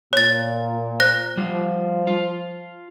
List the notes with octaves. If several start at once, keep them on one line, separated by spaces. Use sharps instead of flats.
A#2 C#5 A6
C5 F#6 A#6
F3 G3 F4
F4